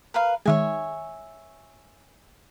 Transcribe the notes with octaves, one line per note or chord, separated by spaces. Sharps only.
A#4 B4 F5
D#3 G#3 C#5 E5 G#5